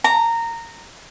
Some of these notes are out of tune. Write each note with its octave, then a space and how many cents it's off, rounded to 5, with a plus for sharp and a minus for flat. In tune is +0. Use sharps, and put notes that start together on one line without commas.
A#5 -15